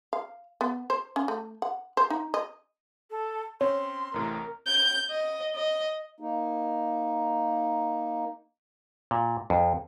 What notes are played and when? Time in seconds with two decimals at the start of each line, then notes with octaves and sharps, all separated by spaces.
0.13 F5
0.61 B3
0.90 C5
1.16 C#4
1.28 A3
1.62 F#5
1.97 C5
2.10 D#4
2.34 D#5
3.10 A4
3.61 C4 C#4 C#5 C6
4.14 A1 A2 C3 A#4
4.67 G6
5.10 D#5
5.55 D#5
6.20 A#3 D#4
9.11 A#2
9.50 F2